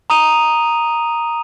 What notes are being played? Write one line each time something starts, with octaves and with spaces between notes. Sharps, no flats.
A#5 D#6 D#7 F7